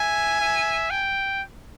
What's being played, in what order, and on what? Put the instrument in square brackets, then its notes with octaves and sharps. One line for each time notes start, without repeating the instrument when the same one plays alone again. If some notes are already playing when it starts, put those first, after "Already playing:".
Already playing: [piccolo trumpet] E5 [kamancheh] G#5
[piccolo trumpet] E5
G5